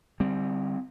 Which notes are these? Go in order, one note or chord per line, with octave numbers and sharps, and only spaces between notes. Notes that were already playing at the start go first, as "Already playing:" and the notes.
D3 G3 C4